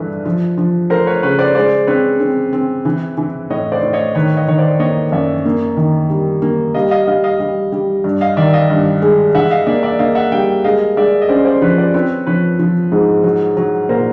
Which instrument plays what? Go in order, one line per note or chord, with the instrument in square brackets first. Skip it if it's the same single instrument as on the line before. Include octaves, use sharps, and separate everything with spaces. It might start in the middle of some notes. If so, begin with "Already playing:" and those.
Already playing: [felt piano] G2 E3 A3 [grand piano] B4
[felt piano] F3
F3
[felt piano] A3 [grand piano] A#4 C5
[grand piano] B4 C#5
[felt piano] C#3 [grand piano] B4 C#5
[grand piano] C5 D5
[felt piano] G#3 [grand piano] C5 D5
[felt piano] C4 [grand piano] B4 C#5
[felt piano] C4
C4
E3
E3
[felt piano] A2 [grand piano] C#5 D#5
[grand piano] C5 D5
[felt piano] A2
[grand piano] C#5 D#5
[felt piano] D#3 [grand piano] B4 C#5
[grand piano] C#5 D#5
[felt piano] D#3 [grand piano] C#5
[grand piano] C5 D5
[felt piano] A#3 [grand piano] C#5 D#5
[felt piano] F#2 [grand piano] D5 E5
[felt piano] A#3
D#3
G3
A#3
[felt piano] G3 [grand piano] D#5 F5
[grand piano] D#5 F5
[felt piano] G3 [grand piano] D#5 F5
[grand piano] D#5 F5
[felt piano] G3
G3
G2
[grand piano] D#5 F5
[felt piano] D#3 [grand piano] D5 E5
[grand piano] D#5 F5
[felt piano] G2
G#3
[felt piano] E3 [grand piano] E5 F#5
[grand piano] D#5 F5
[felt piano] A#3 [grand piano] D5 E5
[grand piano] D5 E5
[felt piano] A#3 [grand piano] D#5 F5
[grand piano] E5 F#5
[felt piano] G3 [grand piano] F5 G5
[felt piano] G#3 [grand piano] D#5 F5
[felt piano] G#3 [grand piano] D5 E5
[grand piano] D#5
[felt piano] C#4 [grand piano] C5 D5
[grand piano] C5 D5
[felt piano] F3 [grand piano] B4 C#5
[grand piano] C5 D5
[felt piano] C4 [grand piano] B4 C#5
[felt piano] F3 [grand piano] B4 C#5
[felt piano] F3
G#2
F#3
F#3
[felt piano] A#2 [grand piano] A#4 C5